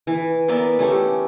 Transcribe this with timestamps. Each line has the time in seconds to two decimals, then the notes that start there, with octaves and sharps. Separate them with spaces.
0.07 E3
0.48 B3 A#4 D5 E5
0.79 A3 C#4 G4